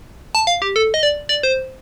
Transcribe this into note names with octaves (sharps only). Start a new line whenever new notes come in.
A5
F5
G4
A4
D#5
D5
D5
C5